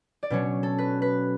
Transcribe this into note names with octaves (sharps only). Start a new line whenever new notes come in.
D5
B2 F#3 C#4 C#5
A4
B4
B4